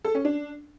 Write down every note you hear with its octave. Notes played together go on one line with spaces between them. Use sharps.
A4
C#4
D4